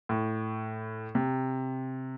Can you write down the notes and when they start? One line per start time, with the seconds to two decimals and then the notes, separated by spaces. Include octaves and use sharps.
0.09 A2
1.15 C3